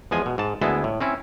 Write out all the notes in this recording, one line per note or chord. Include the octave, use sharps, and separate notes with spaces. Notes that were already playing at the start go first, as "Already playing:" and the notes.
E2 F3 G#3 G#5
B2
G#2 A5
D2 G#3 B3 E4 A5
A2
C4 C#4 E4